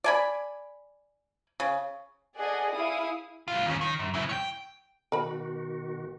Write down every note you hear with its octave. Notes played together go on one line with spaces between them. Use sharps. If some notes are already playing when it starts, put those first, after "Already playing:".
D5 G#5 B5
C#3
G#4 A4 D5 D#5 F#5 G#5
E4 G#4 F5 D#6
C2 F4
D#2 C#4
D#3
F#2
C#3 E4
C#5 G5
B2 D#3 F#4 A#4 B5